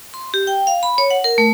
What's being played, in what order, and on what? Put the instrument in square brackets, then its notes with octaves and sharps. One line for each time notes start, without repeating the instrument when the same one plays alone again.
[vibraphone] C6
G4
G5
F5
B5
C#5
F#5
A#4
A3